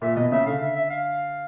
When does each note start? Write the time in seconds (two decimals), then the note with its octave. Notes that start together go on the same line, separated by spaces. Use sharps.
0.02 A#2 E5
0.16 B2 D#5
0.32 C#3 E5
0.46 D3 F5
0.61 E5
0.76 E5
0.90 F5